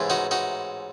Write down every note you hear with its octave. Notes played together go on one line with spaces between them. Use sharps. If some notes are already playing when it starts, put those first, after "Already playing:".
Already playing: A1 G#2 E3
D#4 F#4
D#4 F#4